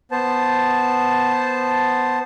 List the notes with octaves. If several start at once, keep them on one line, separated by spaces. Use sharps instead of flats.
B3 C5 A5